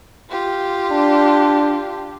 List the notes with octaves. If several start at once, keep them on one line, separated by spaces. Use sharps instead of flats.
F4 G4
D4